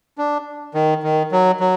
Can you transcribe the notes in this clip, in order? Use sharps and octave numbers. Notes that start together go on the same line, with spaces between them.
D4
D#3
D#3
F#3
F#3